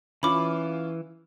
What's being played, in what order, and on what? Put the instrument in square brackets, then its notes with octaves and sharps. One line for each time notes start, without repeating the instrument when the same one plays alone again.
[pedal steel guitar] E3 [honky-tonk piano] C#4 F4 [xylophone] B5 D6